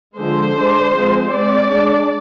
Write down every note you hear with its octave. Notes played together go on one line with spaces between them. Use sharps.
D3 F3 G#3 C5
G#3 D4
F3 G#3 C4
G#3 C4 D5
G#3 D4